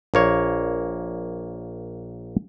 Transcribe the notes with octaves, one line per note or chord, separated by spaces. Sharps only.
A#1 A#3 C#5